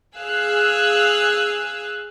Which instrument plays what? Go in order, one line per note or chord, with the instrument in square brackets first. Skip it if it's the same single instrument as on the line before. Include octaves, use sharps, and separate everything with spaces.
[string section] G#4 F5 E6 F#6